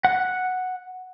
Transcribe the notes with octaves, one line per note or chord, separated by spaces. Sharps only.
F#5